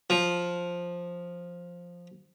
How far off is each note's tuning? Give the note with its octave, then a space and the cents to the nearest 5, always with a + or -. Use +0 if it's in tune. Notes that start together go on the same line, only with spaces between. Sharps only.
F3 +5